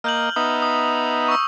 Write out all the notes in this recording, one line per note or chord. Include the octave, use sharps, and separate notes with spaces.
A#3 D#5 F6 G6 F#7
B3 D#4 E5 D#6
D#6
C#6 E6